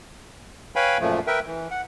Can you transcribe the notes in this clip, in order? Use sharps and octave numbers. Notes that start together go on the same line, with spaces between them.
B4 C#5 F5 G5 G#5 B5
F#2 A#2 F3 A3
A#4 B4 E5 G5
E3
F#5